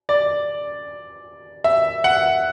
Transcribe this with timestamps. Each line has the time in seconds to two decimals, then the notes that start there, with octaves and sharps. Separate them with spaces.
0.09 D5
1.64 E5
2.04 F#5